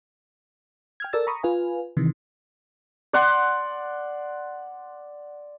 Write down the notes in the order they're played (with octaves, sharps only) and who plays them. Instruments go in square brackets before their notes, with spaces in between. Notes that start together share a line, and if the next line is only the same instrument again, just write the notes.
[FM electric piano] G5 F6 G#6
A4 A#4 D5 E6 A6
A#5 B5 C#6 D#6
F4 B4 F5 G#5
C3 D#3 E3
[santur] D5 F#5 C6